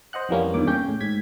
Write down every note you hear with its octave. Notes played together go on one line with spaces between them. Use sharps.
C5 D#5 F#5 F#6
F2 E3 G3 A#3 C#4
E2 G2 A#2 D#3 D6
C#3 C#4 G5 G6
A2
G#2 G#6 B6